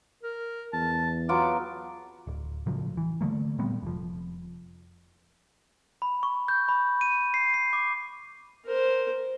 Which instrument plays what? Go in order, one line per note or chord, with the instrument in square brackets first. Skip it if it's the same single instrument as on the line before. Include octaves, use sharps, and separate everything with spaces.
[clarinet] A#4
[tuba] E2 [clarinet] A5
[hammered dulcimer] F#3 B3 F4 [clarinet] D6
[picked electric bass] D1
A2 C#3 F3 F#3
E3
D3 F#3 A3 A#3
A#2 G3 B3 C4
F1 F3
[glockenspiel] B5
C#6
G6
B5
D#7
C7
C7
D6
[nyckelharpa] A#4 C5